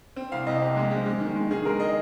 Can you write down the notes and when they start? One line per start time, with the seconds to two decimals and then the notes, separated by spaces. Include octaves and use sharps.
0.16 C4
0.32 C2 F5
0.47 C2 D#5
0.62 C3
0.76 G#3
0.91 G#3
1.06 G#3
1.20 D#3
1.36 G#3
1.51 D#3 G#4
1.65 G#3 A#4
1.80 D#5